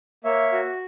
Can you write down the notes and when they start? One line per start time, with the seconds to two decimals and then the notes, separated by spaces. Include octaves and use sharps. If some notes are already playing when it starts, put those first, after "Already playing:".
0.24 A#3 C#5 E5
0.52 F#4